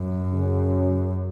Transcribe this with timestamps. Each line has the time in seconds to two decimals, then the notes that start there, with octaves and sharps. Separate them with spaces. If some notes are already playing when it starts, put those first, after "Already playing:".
Already playing: F#2
0.33 C#3 F#3 C#4